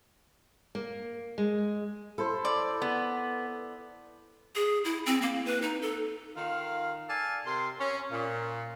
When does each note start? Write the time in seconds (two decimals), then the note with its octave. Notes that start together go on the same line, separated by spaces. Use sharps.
0.75 A#3
1.38 G#3
2.18 E4 A4 C5 C6
2.45 D5
2.82 B3
4.55 G#4
4.85 E4
5.06 C4
5.22 A#3
5.45 B4
5.62 D#4
5.82 A4
6.36 D#3 F4 F5
7.09 A4 D5 F5 G#5 A5
7.46 C3 A#4 C6
7.79 C#4
8.11 A#2